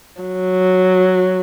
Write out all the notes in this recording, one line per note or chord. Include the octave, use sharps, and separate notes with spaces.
F#3